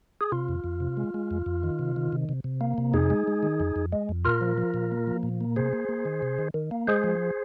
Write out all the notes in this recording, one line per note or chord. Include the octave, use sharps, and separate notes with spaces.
G#4
C3 F4
F2
F2
C3
G#3
G#3
F2
F2
D#3
C3
D#3
C3
C3
C3
A#3
C3
F2 D#4 G#4
G#3
G#3
D#3
F2
F2
G#3
F2
A#2 F4 A#4
F3
F3
A#2
A#3
F3
A#2
A#3
C3 G#4 C5
A#3
A#3
D#3
C3
D#3
D#3
A#3
G#3 G#4 C5
F3